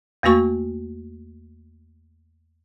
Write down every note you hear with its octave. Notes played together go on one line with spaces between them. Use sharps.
E2 A3 A#3 F#4 C#6